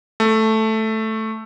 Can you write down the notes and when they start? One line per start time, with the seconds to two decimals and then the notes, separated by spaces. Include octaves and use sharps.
0.20 A3